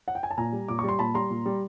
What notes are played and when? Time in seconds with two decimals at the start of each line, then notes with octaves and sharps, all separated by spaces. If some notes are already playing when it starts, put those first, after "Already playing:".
0.08 F#5
0.15 G5
0.23 G#5
0.31 A5
0.37 A#2 G#5 A#5
0.53 G3
0.68 A#2 D6
0.79 G3 C#6
0.89 C6
0.99 A#2 A5 B5
1.14 G3 A#5 C6
1.30 A#2
1.46 G3